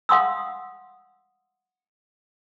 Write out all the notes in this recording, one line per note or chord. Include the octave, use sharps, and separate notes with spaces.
F5 F#5 C6 D#6 E6